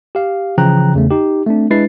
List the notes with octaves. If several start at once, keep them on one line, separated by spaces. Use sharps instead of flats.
G4 F5
C#3 E3 F3 G5 A#5 F#6
E2 C#3 A3
D#4 G4
A3 C4 D4
G#3 D4 E4 B4 A6 C7